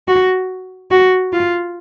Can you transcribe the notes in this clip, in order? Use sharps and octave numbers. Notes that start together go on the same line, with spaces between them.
F#4
F#4
F4